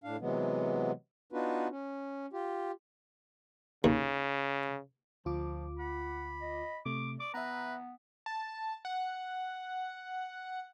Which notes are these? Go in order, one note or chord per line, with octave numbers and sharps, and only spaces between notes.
A2 D4 F5
C3 E3 F#3 G#3 B3
B3 D4 D#4 F4 F#4 B4
C#4
F4 G4
D#2 C#3
D2 F3 F4 D6
F#5 B5
D#5
C3 A3 D6
D5 D6
B3 B4 E5 A#5
A5
F#5